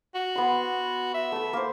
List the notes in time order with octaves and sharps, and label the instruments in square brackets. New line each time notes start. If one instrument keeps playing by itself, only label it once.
[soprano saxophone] F#4
[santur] B3 C6
[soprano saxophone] E5
[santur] A3 A4
A#3 C5